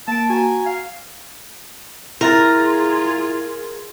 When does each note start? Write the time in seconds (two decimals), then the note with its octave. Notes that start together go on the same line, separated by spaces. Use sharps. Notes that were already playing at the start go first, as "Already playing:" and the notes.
0.08 A#3 A5 D7
0.30 F#4 G#5 A#5
0.66 F5
2.21 E4 F4 G#4 A#4 E5 A6